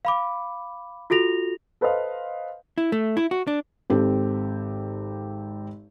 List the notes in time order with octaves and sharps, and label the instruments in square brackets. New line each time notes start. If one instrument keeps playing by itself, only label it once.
[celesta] F5 B5 D6
F4 F#4 A4 A#6 F7
[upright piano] A4 B4 C5 D#5 F5
[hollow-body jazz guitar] E4
A3
E4
F#4
D4
[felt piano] G#1 C4 G4 A4